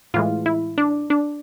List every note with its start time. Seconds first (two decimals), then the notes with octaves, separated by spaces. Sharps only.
0.14 A2 E3 G#3 F4
0.46 E4
0.78 D4
1.10 D4